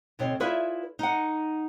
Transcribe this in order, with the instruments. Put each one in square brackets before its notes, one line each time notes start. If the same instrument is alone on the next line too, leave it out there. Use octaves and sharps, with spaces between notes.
[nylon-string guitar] D2 B2 C4 C#5
E4 F4 G#4 B4 D5 E5
D#4 F#5